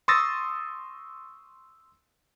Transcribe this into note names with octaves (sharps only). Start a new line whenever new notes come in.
C6 C#6 D#6 E6 A6 A#6